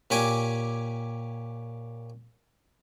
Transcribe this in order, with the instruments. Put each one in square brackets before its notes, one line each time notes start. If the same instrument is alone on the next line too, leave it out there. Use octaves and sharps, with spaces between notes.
[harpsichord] A#2 C#4 G4 G#5 D6